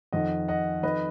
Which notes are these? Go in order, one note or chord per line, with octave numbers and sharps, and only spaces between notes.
F2 D#3 D#5 F#5
D#5 F#5
F2 D#3 B4 D#5